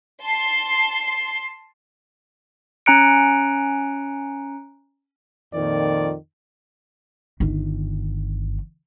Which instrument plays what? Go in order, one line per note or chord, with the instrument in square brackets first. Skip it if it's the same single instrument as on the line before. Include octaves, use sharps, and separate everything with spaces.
[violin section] A5 C6 C7
[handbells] C#4 G#5 A#5 F#6 C#7 D7
[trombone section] F2 A#2 D#3 [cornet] D5
[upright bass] G1 D#3